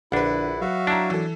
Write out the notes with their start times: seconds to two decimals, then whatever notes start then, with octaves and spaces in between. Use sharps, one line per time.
0.12 A#1 D3 D4 E4 B4 F#5
0.61 F#3 F#4 E5 F5
0.87 D4 E4 A5 A#5
1.10 E3 A4